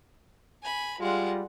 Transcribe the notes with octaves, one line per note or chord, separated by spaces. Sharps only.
G#5 B5
G3 G#3 F4 F#5